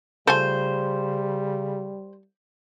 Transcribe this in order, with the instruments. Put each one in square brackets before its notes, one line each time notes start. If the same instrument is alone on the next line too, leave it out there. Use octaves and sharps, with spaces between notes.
[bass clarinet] C#3 [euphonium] G3 [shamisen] A3 F4 G#5 [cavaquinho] C5